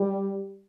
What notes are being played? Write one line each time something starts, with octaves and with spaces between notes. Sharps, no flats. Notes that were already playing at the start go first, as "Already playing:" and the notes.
Already playing: G3